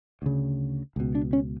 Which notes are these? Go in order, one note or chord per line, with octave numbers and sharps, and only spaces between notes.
D2 C#3
C#2 B2
D4
C#4